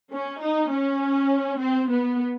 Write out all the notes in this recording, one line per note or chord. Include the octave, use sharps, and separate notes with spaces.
C#4
D#4
C#4
C4
B3